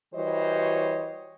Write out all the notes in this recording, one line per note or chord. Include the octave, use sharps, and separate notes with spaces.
E3 G3 F#4 C5 C#5 D#5